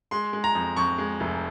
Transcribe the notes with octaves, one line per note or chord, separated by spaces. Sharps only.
G#3 C6
G#3
A#5
F2
F2 C#6
G#3
F1